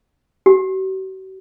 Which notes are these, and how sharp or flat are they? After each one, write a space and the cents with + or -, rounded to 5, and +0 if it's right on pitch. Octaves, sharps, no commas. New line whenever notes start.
F#4 +45